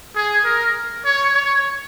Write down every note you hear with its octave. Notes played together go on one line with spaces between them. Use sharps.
G#4
A#4
C#5
C#5